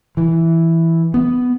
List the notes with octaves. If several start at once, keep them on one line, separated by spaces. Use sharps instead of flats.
E3
B3